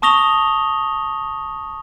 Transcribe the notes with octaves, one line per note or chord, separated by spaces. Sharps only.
A5 C#6 D#6 A#6 F7 G7